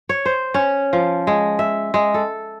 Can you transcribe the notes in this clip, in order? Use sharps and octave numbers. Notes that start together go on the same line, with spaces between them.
C#5
C5
C#4
F3
G#3
E5
G#3
A4